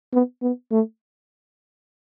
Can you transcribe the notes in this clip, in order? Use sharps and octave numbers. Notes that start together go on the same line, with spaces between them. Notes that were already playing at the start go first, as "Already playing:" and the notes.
B3
B3
A3